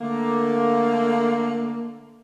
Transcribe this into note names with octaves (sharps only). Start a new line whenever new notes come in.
D3 A3 A#3